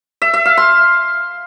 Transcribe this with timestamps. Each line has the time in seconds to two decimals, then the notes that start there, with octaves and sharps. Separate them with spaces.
0.22 E5
0.34 E5
0.45 F5
0.57 C6